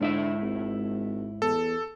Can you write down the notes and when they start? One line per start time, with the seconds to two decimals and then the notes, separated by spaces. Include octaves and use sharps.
0.01 G#2 D3 E4 E5
0.42 G#1
1.42 E2 A4